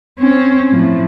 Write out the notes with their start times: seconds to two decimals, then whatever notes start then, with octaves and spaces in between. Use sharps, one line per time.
0.19 C4 C#4
0.71 A2 F3